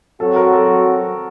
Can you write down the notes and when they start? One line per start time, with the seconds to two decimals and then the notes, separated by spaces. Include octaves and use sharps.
0.20 F#3 C4 F#4 A4
0.36 A#4
0.53 A4